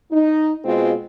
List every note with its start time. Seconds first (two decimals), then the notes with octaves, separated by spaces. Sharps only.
0.12 D#4
0.65 B2 G#3 C4 F4